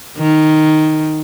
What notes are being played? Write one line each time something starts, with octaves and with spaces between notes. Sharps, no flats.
D#3